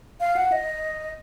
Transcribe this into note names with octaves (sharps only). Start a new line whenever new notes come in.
F5
F#5
D#5